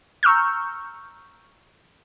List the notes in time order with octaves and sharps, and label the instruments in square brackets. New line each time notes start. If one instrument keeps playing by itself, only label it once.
[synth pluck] A#5 C#6 E6 F6 G6